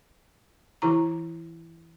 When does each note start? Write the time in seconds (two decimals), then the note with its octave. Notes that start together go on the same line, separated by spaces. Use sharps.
0.82 E3 E4 A#5